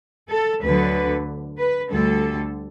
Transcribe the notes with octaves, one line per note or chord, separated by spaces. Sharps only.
A4
D2 D3 F#3 B4
B4
D2 D3 G3 A4